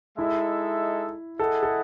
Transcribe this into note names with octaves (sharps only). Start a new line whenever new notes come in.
G#3 D#4 E4 A4 E5
E4 G#4 A4 D#5 F#5
A4